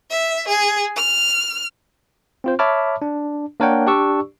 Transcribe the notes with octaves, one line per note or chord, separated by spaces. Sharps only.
E5
G#4
F6
C4 F4 C5
C#5 E5 A5 B5 D6 F6
D4
A#3 D4 A#4 C#5 F#5 G5
D4 G4 D5 C#6 E6